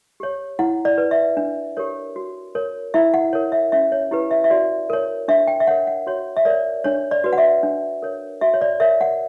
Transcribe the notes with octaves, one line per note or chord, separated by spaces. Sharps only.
G4 C#5
E4 F#5
D5
B4
E5
D4
G4 A#4 C#5
F#4
A#4 C#5
E4 E5
F#5
A#4 C#5
E5
C#4 E5
C#5
E4 G4 B4
E5
E5
F#4 D5
A#4 C#5
D4 E5
G5
E5
A#4 C#5 F#5
F#5
F#4 C#5
E5
A#4 C#5 D5
D4 C#5
D5
F#4 B4
F#5
E5
D4
A#4 C#5
F#4 E5
C#5
D5
A#4 C#5 E5
F#5